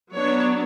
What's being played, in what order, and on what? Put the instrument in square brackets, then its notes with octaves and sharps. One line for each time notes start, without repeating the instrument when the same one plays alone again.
[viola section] F#3 B3 D4 C#5